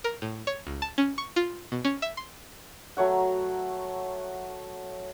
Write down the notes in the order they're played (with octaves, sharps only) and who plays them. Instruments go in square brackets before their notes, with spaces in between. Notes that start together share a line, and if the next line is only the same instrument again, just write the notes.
[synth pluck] A#4
A2
C#5
C#2
A5
C#4
C#6
F4
B2
C#4
E5
C6
[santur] F#3 A3 C#5 F#5